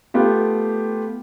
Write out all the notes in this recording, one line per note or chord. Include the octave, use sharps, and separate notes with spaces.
A3 B3 F4 G4